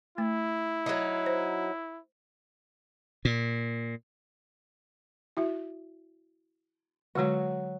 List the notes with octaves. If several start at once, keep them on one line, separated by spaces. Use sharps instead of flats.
A3 E4
F#3 D#4
C5
A#2
E4 F#4 E5
D3 F#3 G#3 F#4 C#5